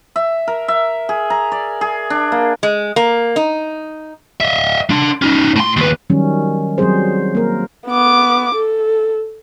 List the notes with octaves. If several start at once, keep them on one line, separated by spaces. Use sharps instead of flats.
E5
A#4
E5
G#4
A#5
D5
G#4
D4
A#3
G#3
A#3
D#4
D#5 E5
D4 C6
C#4 D#4
A2 C6
D#2 B4
D#3 F#3 G3 C#4
F#3 G3 C4 G#4 C5
A#3 A#4
B3 D6
A4